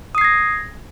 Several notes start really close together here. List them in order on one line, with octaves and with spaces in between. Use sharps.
D#6 C7 G#6 A#6